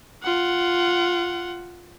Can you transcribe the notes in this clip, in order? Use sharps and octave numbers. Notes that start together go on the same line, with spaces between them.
F4 F#5